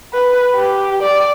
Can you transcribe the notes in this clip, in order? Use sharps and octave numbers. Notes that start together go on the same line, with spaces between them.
B4
G4
D5